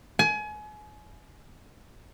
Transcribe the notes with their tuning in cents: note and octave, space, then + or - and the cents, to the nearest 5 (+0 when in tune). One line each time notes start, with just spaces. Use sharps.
G#5 +30